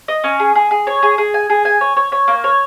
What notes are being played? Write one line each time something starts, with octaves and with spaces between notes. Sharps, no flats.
D#5
C#4
G#4
G#4
G#4
C#5
G#4
G#4
G#5
G#4
G#5
C#5
C#5
C#5
A#3
C#5